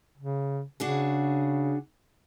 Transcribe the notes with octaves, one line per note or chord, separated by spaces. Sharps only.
C#3
C#3 D4 F#4 G#4